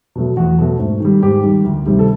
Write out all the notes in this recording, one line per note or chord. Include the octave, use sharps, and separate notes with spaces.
B2 F#3 A3
E2 F#4
B2 F#3 A3
G#2
D#3 G3
G#2 G4
D#3 G3
D2
C3 D#3 G3
A4